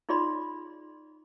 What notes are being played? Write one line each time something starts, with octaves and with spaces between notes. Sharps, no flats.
D#4 F4 G#4 D5 B5 C6